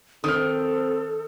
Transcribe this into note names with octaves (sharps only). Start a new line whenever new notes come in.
D#3 C4 A4 D#6 F6